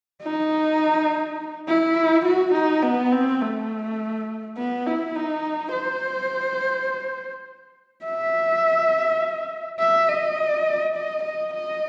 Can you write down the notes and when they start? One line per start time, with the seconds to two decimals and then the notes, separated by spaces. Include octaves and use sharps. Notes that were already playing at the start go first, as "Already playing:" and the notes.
0.23 D#4
1.68 E4
2.26 F#4
2.54 D#4
2.83 B3
3.12 C4
3.41 A3
4.58 B3
4.87 E4
5.15 D#4
5.73 C5
8.05 E5
9.79 E5
10.09 D#5
10.96 D#5
11.24 D#5
11.54 D#5